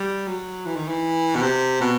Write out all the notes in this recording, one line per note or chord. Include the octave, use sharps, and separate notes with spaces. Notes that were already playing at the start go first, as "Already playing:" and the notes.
Already playing: G3
F#3
E3
D#3
E3
B2
C3
B2